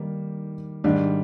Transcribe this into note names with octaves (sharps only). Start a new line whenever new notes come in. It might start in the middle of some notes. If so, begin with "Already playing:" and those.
Already playing: D#3 G3 A#3
G#2 D#3 G3 D4